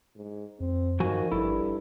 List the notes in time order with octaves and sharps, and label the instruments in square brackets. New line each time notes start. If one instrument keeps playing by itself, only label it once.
[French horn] G#2
[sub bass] F2 [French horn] C4
[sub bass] G2 [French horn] D#3 [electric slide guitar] F3 F#4 G#5
[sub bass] G#1 [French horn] G2 [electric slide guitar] E4 A4